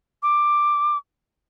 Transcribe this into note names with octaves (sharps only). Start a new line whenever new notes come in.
D6